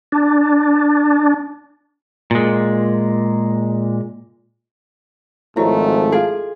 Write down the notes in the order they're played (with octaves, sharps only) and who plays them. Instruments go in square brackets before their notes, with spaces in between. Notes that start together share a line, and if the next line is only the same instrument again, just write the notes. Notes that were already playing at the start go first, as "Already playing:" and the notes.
[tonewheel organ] D4
[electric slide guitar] A#2 G#3
[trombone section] G#1 F3 [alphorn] A3 [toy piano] E4 F#4 D#5 [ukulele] C#5
[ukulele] F4 G#4 [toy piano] A4